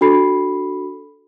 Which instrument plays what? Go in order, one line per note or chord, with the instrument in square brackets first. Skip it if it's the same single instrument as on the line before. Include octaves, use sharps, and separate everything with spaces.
[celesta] D4 F#4 A4 B5 C7